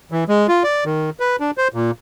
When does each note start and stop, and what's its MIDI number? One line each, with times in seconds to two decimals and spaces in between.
0.12 0.24 52
0.29 0.47 56
0.48 0.63 65
0.64 0.84 74
0.85 1.10 51
1.20 1.36 71
1.40 1.51 62
1.58 1.68 72
1.74 1.91 46